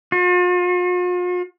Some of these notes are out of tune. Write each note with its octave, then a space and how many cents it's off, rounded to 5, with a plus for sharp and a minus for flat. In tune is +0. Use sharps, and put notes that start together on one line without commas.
F4 +45